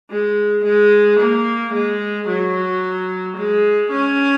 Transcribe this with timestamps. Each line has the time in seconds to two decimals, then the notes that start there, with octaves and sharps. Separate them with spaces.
0.10 G#3
0.64 G#3
1.19 A#3
1.73 G#3
2.28 F#3
3.37 G#3
3.91 C#4